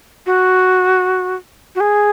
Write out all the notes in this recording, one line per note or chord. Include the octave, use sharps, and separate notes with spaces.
F#4
F#4
G#4